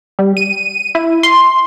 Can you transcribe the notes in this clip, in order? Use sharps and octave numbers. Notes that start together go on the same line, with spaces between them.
G3
D#7
E4
C6